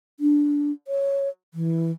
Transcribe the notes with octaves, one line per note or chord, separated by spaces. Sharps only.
D4
C#5
E3